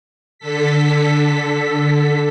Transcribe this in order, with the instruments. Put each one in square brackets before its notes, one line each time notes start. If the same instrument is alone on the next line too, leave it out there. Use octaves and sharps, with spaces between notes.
[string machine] D3 A4 B6